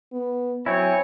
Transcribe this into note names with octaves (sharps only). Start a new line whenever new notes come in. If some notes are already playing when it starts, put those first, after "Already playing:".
B3
F#3 C4 E4 C#5 G#5